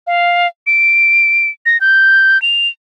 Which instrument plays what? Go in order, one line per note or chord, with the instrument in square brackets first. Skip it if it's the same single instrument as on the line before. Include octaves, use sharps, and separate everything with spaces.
[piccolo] F5
D7
A#6
G6
F7